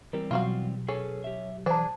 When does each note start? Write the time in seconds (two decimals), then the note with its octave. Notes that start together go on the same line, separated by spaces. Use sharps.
0.13 E3 G3 C4 A#4
0.31 B2 F#3 F4 F#4 F5
0.89 C#4 G#4 A4 B4
1.24 G4 E5
1.66 E3 D4 G#4 C5 A5